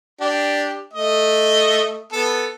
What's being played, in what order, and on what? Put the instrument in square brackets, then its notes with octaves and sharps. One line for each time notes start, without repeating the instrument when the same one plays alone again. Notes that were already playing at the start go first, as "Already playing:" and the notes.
[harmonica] D4 G4
A3 D#5
B3 A4